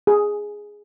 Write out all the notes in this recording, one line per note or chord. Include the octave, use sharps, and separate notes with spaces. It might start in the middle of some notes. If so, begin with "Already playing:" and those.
G#4